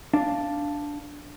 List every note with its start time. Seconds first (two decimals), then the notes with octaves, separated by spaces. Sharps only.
0.13 D4 F5